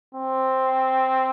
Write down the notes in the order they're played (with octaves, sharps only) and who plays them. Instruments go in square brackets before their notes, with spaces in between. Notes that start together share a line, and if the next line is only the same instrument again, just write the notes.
[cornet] C4